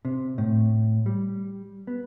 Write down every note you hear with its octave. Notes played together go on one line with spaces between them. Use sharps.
C3
A2
G3
B3